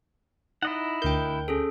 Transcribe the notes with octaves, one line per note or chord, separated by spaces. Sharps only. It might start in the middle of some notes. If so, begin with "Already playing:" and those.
D#4 E4 D#5 F#5
D2 A#4 G5 G6
C#4 G#4 A4